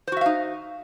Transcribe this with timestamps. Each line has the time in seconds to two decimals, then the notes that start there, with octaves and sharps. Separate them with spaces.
0.07 C5
0.12 F#4
0.17 E5
0.21 F5
0.26 D#4